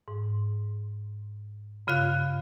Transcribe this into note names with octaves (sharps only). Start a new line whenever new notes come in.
G#2
G2 C#3 F4 F5 F#6